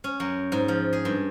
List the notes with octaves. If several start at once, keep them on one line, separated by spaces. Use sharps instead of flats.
C#4
F#2
G#2
F3
G#4
G2